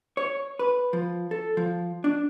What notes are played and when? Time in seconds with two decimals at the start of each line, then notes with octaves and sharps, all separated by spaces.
0.17 C#5
0.59 B4
0.93 F3
1.31 A4
1.57 F3
2.04 D4